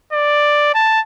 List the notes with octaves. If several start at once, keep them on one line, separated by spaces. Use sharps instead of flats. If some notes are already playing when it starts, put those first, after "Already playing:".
D5
A5